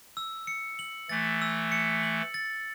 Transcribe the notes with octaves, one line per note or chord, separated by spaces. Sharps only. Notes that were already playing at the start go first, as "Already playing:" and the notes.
E6
C#7
F#7
E3 A3 A6
E6
C#7
F#7
A6